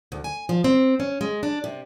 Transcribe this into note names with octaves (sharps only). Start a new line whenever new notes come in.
D2
G#5
F3
C4
C#4
G#3
D4
C3